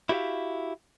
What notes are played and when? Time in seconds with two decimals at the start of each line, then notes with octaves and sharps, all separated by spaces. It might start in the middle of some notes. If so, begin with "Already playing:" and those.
0.09 E4 F#4 G4 D5 E5 F5